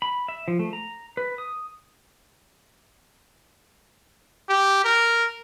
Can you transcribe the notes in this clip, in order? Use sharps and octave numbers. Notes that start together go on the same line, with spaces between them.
B5
E5
F3
A3
A#5
B4
D#6
G4
A#4